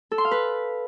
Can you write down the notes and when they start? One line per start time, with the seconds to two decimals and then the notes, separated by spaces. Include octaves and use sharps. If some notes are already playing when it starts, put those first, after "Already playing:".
0.12 A4
0.18 C6
0.25 F5
0.31 B4